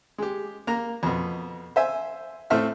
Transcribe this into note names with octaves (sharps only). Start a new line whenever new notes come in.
G#3 G4
A#3 A#5
F2 B2
C5 E5 G#5
A2 A3 C4 E5 F6